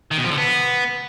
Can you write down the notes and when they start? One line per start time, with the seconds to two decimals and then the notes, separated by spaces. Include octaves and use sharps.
0.11 D#3
0.18 B2
0.25 F3
0.31 D3
0.38 B3